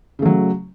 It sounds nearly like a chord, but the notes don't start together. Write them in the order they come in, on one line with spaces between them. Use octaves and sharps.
C#3 A3 F#3